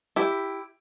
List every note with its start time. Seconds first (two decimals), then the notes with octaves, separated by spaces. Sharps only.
0.16 E4 G4